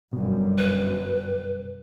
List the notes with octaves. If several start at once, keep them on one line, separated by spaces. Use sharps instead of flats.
G1 F#2 B2 G3
B4